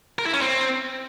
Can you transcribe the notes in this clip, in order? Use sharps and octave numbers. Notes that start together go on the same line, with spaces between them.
A#4
E4
C#4
C4